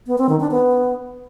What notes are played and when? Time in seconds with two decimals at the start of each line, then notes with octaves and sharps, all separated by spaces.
0.07 B3
0.18 C4
0.29 D#3
0.40 D4
0.51 B3